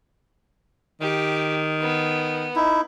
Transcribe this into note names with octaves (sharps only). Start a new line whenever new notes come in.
D#3 G4
B3
D#4 E4